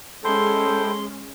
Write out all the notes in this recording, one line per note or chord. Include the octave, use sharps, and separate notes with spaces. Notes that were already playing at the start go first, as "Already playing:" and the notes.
G#3 C#4 E4 A4 C5 G5 C6